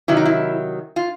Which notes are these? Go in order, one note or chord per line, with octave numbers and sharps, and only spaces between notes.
C3 D#3 F#3 E4
D#4
E4
F4